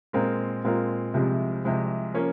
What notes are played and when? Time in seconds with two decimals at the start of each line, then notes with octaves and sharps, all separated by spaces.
0.13 A#2 G#3 C4 F4 A#4
0.64 A#2 G#3 C4 F4 A#4
1.14 C2 C3 F3 G#3
1.65 C2 C3 F3 G#3
2.14 F3 A#3 C#4